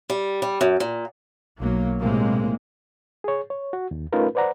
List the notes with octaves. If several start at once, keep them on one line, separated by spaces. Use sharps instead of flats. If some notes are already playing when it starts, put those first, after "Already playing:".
G3
G3
F#2
A#2
B1 F#3 A#3
B1 A2 C3 G#3 A#3
G#4 C#5
C#5
F#4
D#2
A3 C#4 D#4 F4 A#4 B4
B4 C5 D5 F#5 A#5